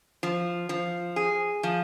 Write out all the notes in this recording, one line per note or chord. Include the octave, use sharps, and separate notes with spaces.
F3
F3
G#4
F3